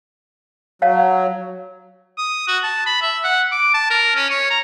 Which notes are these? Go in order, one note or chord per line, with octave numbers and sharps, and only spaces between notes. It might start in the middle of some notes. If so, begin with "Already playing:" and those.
F#3 C#5 F5 A5
D#6
F#4
A5
B5
E5
F#5
D6
A5
A#4
C#4
C#5
A#5